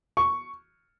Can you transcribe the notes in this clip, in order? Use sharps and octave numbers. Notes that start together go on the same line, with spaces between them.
C#6